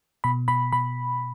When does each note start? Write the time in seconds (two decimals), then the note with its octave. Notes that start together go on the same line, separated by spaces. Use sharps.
0.24 B2 B5
0.48 B2 B5
0.72 B2 B5